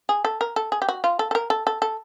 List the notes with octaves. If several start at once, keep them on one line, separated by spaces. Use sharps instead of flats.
G#4
A4
A#4
A4
G#4
G4
F#4
F4
A4
A4
A#4
A4
A4
A4